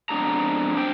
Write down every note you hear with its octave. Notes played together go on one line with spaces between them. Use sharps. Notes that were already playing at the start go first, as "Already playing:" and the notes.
F2 G#3 B3 D4 G#4 A#5
D4 C5 G5